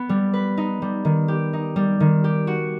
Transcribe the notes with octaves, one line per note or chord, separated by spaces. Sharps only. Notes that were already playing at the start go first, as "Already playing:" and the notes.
Already playing: B3 B4
G3
B4
D#4
G3
D#3
G4
D#4
G3
D#3
G4
F#4